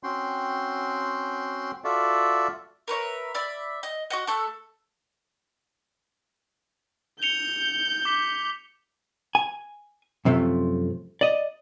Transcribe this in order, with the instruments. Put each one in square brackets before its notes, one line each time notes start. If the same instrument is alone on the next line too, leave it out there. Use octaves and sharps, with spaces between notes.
[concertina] C4 C#4 F#4 G5 C6
F4 F#4 A4 D5 E5
[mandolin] A#4 B4 C#5 E5
D5 E5 B5
D#5
F#4 D#5 F#5
A3 A4 C#6 F#6
[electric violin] G6 [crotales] C#7 F7 G7
[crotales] D6 B6
[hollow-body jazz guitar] G#5
F#2 C3 F3 A3
D5 D#5